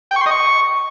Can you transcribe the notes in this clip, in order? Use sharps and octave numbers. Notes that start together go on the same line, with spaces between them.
G5
C#6
C6
D#5
C#6